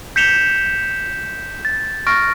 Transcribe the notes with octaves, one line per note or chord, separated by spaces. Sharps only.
G6 B6 C#7 E7 F7 G7
A6
C#6 F6 A6 A#6 D7